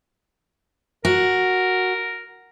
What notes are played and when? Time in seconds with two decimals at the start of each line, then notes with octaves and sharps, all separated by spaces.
1.05 F#4 A#4